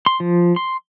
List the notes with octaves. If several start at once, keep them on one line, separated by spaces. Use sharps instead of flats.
C6
F3
C6